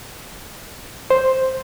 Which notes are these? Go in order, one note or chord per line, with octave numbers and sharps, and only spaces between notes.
C5